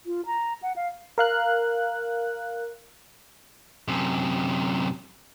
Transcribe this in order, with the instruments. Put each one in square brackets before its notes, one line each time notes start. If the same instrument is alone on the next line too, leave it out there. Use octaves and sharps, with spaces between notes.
[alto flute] F4
A#5
F#5
F5
[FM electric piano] A#4 F5 F#6
[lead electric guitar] F#2 C3